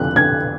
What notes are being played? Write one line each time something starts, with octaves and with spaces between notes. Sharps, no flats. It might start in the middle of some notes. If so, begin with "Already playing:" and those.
Already playing: F2 D3 F#6
D3 G#6